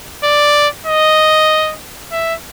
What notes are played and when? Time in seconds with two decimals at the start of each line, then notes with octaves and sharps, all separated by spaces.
0.23 D5
0.86 D#5
2.12 E5